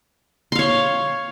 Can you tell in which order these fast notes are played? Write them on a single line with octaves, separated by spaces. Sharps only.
C6 F5 C#5